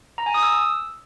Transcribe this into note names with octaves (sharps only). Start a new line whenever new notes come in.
A#5
G#5
D#6
E6